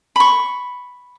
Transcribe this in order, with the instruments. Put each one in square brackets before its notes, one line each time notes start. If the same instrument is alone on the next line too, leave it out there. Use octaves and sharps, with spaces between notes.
[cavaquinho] B5 C#6